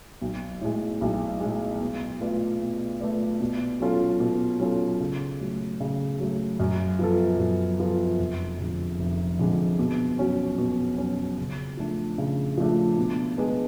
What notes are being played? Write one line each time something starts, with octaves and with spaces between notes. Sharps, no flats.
B1
A2 G#3
B1
A2 G#3
B2
A3 F4 B4 D5
B2
A3 F4 B4 D5
B2
F#3 C#4 F4 A4
B2
F#3 C#4 F4 A4
C#3
F#3 A3
C#3
F#3 A3
F#2
F3 B3 F4 A4
F#2
F3 B3 F4 A4
F1
F2 D3 G#3
F1
F2 D3 G#3
B2
F#3 C#4 F#4
B2
F#3 C#4 F#4
C#3
F3 A3 D4
C#3
F3 A3 D4
B2
G#3 B3 D4